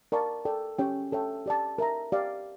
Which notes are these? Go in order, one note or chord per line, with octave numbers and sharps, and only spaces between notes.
A#4 D5 F5 A5 C#6
A4 D5 G5
C#4 G4 C#5 G5
A4 C#5 E5 G5
G4 D5 A5
A#4 E5 A#5
G4 D5 F5